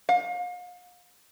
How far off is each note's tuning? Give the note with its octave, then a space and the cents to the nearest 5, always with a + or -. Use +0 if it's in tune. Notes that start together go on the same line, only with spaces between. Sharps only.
F5 +40